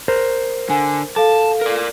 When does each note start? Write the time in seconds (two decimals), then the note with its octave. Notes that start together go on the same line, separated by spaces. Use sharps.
0.08 A#4 C5
0.70 D3 G#5
1.16 A4 F5 A5
1.61 A#4 D5